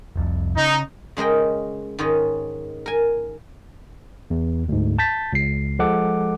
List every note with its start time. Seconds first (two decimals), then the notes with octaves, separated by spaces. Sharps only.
0.16 F1 C2 F2
0.57 C#3 D#4
1.17 C#3 G#3 A#4 D#5 G5
1.99 G#2 D#3 C#4 D#5
2.86 A#4 G#5
4.30 E2
4.68 D2 G#2
4.99 A5 G6 A6 B6
5.33 C#2 C7
5.79 F3 G#3 A4 F#5 D6